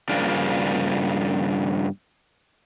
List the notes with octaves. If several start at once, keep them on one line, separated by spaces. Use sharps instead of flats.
G2 C#3 F3 A#3 D4